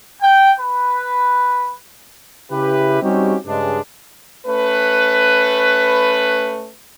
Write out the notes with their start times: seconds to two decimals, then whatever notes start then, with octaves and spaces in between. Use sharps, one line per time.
0.21 G5
0.59 B4
2.52 C#3 E4 G4 B4
3.02 G3 C4 C#4 D#4 F#4 G4
3.46 G2 C#3 G#3 D4
4.47 A3 C#4 B4